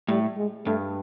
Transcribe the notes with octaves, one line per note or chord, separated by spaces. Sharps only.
A2 G3
G#3
G2 A3